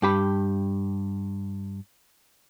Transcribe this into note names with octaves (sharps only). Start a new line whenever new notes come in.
G2 G4 B5